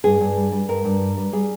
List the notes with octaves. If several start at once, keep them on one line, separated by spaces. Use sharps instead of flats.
G2 G#4
G2
G3
G3
G2 A#4
G2
G3
G3
G3 G#4